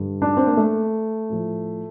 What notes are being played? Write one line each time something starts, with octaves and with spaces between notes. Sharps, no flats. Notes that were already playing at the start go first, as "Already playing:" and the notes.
Already playing: G2 D3 G3
D4
C4
A#3
A3
A2 F3